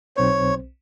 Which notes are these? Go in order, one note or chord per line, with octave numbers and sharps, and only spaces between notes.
B1 C4 C5 C#5